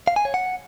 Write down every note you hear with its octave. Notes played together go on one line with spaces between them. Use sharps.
F5
G#5
C#5
F#5